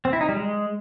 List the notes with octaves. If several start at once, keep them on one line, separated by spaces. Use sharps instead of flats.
C4
E4
D#4
G3
G#3